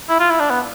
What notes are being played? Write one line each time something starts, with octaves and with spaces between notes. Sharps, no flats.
E4
F4
E4
D4
B3